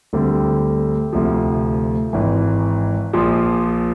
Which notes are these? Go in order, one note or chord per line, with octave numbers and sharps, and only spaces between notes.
D2 D3 G3 C4
D2 C3 F3
G#1 G#2 E3
A#1 A#2 F3